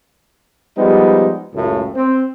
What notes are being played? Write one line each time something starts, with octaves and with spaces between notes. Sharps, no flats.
F3 G3 G#3 B3 D#4
C#2 F#2 A2 C#3
C4